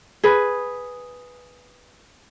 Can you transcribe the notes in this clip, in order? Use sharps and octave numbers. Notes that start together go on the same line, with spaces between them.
G#4 B4